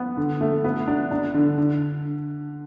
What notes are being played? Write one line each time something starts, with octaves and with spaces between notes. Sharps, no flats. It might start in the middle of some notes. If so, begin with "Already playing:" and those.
Already playing: B3
D3
A3
B3
D4
D4
D3
D3